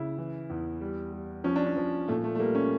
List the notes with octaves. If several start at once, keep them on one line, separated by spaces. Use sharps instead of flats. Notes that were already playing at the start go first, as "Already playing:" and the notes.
Already playing: C#3 E4
E3
E2
G3
G3
F3 C#4
D4
C#4
F3
A#2 A3
A3
A3
G3 A#3
C#4